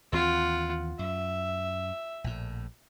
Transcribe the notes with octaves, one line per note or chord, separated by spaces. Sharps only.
D#2 E3 C4 F4 F#5
F#2 E5
A#1 A2